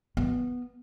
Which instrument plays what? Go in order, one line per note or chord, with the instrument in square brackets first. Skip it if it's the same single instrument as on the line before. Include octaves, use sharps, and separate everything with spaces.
[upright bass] B3